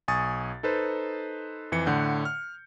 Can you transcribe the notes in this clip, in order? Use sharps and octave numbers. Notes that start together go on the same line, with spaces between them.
B1 G#5 C#6 D#6 A6
D#4 A4 B4 C5
F2 E3 C#7
A2 D3 F#5 G6
F6